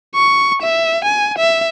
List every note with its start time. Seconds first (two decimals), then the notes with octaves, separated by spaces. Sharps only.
0.15 C#6
0.62 E5
1.04 G#5
1.38 E5